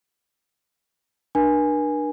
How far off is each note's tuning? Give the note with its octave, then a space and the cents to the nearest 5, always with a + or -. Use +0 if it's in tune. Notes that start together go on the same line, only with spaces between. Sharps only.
D4 +25 A#4 +45 G#5 +0